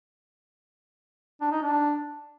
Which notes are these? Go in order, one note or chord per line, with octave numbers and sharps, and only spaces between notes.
D4
D#4
D4